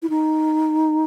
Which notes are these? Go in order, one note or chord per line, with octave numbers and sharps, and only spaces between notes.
E4
D#4